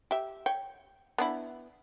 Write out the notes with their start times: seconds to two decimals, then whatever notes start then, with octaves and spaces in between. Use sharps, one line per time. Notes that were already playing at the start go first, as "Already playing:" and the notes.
0.11 G4 E5
0.46 C#5 G5
1.18 B3 D4 E4